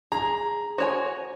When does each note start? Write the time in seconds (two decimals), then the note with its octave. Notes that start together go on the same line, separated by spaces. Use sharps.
0.12 G#4 A#5
0.78 F#4 C5 C#5 G#5